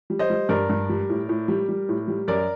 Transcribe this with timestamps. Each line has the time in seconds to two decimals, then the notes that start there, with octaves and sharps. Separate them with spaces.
0.10 G3
0.19 C5 D#5
0.30 G3
0.49 G2 A#4 D5
0.69 G2
0.89 G3
1.09 A2
1.29 A2
1.48 G3
1.69 G3
1.89 A2
2.08 G3
2.28 F#2 A#4 D5